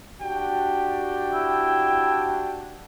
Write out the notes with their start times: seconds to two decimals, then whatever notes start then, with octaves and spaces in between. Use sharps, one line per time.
0.22 D4 F#4 G4 G5
1.33 E4